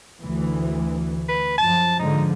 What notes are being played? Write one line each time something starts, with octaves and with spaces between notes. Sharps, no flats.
D2 E3
B4
F#2 F3 A5
G#2 D3 F3 D#4